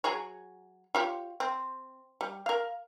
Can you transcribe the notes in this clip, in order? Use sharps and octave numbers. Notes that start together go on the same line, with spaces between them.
F#3 G#4 C#5
F4 G4 C#5
C4
G3
A#4 F5